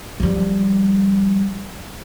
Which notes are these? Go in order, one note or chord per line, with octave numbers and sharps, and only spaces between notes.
F3 G3